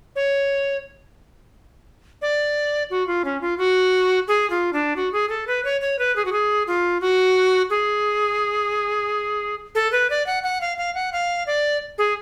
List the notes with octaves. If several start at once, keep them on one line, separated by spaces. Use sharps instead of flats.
C#5
D5
F#4
F4
C#4
F4
F#4
G#4
F4
D4
F#4
G#4
A4
B4
C#5
C#5
B4
G#4
F#4
G#4
F4
F#4
G#4
A4
B4
D5
F#5
F#5
F5
F5
F#5
F5
D5
G#4